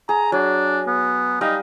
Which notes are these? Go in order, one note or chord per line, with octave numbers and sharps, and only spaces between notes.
G#4 A#5
F#3 D4
B3
G3 D#4 D#5 F5